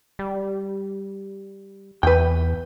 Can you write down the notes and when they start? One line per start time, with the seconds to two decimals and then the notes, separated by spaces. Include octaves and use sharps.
0.19 G3
2.03 E2 B4 G5